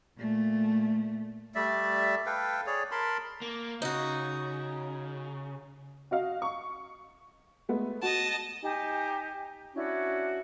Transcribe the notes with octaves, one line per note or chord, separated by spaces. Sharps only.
A#2 A3
G3 A3 D5 E5
A4 B4 F5 G5
G#4 C#5 D5
A#4 A5 B5 C6
A#3
C#3 D#4 F#4
F#4 D#5 F5
C#6
G#3 A3 B3
F#4 D#5 A5
D#4 G4 G#5
C#4 D4 E4 F#4